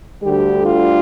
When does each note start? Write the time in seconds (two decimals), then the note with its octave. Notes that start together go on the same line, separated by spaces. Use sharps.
0.23 D2 D3 G3 G4
0.65 F4